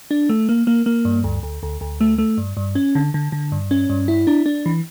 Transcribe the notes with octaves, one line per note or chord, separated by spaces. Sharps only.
D4
A3
A#3
A#3
A#3
G2
D2
D2
D2
D2
A3
A3
G2
G2
C#4
D3
D3
D3
G2
C#4
G2
E4
D4
D4
E3